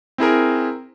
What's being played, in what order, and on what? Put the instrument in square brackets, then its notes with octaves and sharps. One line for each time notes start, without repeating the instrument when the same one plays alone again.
[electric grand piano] C4 E4 G#4 A#4